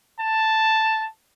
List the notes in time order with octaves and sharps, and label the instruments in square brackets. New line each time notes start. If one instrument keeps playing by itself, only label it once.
[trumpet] A5